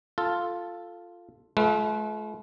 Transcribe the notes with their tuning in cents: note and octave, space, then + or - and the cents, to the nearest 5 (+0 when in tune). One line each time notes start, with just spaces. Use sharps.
F4 +0 A4 +0
A3 -45 F4 -5 B4 +0